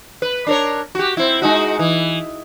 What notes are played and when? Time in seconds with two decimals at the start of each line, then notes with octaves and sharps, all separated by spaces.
0.22 B4
0.47 D4 A#4 C#5
0.95 F#4 G4
1.17 C4 E4
1.42 G#3 D#4 F#4
1.79 E3